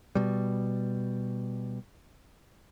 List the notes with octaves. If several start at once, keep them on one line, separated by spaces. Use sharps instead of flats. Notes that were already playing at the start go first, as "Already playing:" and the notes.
B2 G3